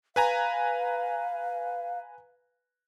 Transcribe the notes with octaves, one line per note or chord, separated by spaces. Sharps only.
B4 F5 G#5 A#5